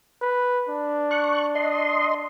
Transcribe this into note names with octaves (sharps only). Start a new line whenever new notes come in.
B4
D4
C#6 F#6
D#5 C6